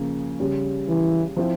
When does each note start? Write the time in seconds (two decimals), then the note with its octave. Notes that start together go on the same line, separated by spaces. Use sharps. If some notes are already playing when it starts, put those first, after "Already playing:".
Already playing: C#3 F3 A#3
0.40 C#3 G3 C#4
0.88 E3
1.37 F3 C4 E4